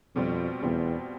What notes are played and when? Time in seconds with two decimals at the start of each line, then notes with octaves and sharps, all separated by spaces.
0.16 F2 B2 G3 C4 F4
0.62 E2 B2 G3 C4 F4